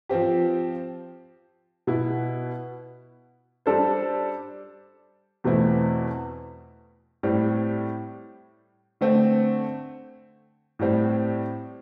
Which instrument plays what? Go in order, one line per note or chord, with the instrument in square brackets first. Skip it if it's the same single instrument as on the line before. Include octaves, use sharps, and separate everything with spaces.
[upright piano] F3 C4 G4
B2 B3 E4
G3 D4 A4 C5
E2 B2 A3 C4 E4
A2 G3 C4
D3 A3 C4
A2 G3 C4